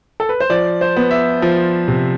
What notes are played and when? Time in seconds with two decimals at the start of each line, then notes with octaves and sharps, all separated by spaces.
0.20 A4
0.29 B4
0.40 C5
0.50 F3 D5
0.81 C5
0.97 B3
1.11 E5
1.42 F3
1.88 C3